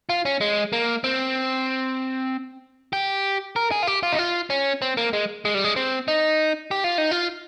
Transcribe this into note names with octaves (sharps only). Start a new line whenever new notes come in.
F4
C#4
G#3
A#3
C4
G4
A#4
G#4
F4
G4
F4
D#4
F4
C#4
C4
A#3
G#3
G#3
G3
G#3
C4
D#4
G4
F4
D#4
F4